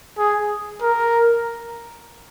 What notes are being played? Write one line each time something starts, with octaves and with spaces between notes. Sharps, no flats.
G#4
A#4